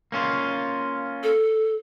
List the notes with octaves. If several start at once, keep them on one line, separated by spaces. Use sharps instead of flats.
A#3 C#4 F4
A4